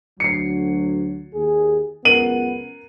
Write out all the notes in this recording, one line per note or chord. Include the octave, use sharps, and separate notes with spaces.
D2 F#3 C7 C#7
D#2 G#4
C#2 F#2 B3 A#4 D#7 F#7